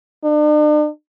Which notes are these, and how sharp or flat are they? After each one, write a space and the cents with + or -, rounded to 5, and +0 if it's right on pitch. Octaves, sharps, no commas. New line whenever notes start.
D4 +40